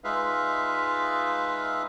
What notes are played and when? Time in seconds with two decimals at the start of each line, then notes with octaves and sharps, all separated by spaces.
0.04 G#3 D#4 F4 B4 E5 F5